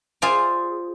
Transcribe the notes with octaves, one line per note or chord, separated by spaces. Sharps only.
F4 G#4 C5 D5